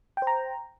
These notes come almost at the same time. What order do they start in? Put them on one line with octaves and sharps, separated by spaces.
G5 C5 A#5